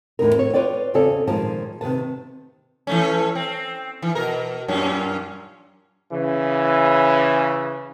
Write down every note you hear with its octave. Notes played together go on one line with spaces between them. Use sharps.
E2 A2 D3 F#3 D#4 A#4
C4 C#5
F4 B4 C#5 D5 G5
E2 C#3 C4 C#4 A4 D5
A#2 D#3 F3 G#3 A5
C3 D#3 B4 A5
E3 A3 C#4
C4
E3
B2 A#4
F#2 A#2 C#4
C#3 E3